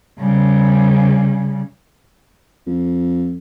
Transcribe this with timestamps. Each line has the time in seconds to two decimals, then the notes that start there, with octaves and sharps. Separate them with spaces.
0.19 C#3 G3
2.67 F2